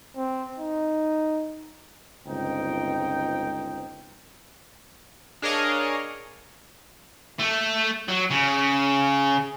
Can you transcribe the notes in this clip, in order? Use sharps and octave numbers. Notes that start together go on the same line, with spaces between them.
C4
D#4
G1 C#2 C4 D#4 G5
D4 G#4 A#4 C#5 D#5 F5
A3
F#3
C#3